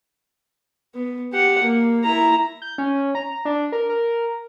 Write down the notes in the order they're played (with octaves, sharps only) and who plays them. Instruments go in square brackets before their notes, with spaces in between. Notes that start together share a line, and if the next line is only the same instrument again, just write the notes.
[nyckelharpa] B3
G4 F#5
A#3
E4 A#5
[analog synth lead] G6
C#4
A#5
D4
A#4
A#4